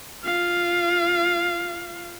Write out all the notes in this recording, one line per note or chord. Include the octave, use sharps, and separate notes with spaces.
F4 F5